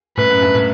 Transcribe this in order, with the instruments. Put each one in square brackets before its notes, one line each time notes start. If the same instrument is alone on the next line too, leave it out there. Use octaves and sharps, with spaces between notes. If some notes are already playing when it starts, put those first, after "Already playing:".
[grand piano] F#2 A2 [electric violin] B4
[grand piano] F#2
G2
A2